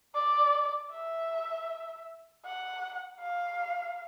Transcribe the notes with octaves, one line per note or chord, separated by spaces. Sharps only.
D5
E5
F#5
F5